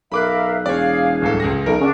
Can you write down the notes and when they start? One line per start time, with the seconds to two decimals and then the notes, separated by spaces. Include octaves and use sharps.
0.12 B1 A#4 E5 F5 B5 D6 F#6
0.66 E1 G#4 C#5 D5 F5
1.21 D1 C2 A4
1.40 C#2 G#4 A#6
1.66 B1 A#4
1.80 C#3 D4 F#4